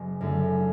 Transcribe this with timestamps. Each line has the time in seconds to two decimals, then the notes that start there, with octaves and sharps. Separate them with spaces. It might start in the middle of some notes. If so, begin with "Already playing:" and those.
Already playing: F#1
0.21 F#2 D3 A3